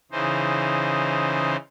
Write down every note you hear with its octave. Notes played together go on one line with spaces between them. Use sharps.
C#3 E3 D#4 C5